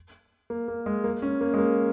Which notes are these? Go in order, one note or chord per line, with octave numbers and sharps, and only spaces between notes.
A#3
A#3
G#3
A#3
C#4
A#3
G#3
A#3